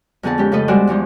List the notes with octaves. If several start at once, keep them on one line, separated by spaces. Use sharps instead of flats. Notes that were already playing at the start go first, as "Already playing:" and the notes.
F2 D3 B3 G#4 A5
G#3 C#4 G4
C#3 F3 A3 A4 B4 D#5
G3 G#3 F#4 G#4 C5 D5
E2 E3 F3 G#3